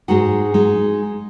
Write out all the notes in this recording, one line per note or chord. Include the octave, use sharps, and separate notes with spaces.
G#2 G#3 D#4 F#4 F#5
G#3 D#4